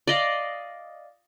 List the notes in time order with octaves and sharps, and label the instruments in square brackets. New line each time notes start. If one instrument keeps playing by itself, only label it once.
[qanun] D5 D#5 F5